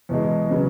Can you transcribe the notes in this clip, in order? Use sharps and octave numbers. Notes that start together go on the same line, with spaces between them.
E2 B2 G#3
C#3 F#3 B3